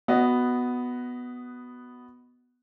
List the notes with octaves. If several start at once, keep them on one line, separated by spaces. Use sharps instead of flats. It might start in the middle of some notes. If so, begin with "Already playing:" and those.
B3 F#4 D#5